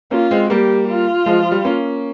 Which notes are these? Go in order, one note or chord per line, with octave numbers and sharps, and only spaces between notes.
A#3 C#4 F4
G#3 C4
G3 A#3 G4
F4
F3 G#3
F3
G3
A#3 C#4